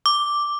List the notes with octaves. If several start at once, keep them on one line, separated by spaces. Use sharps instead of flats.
D6